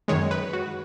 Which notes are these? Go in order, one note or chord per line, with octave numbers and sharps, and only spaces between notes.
F#2 D#3 G#3 C#5
B4
F#4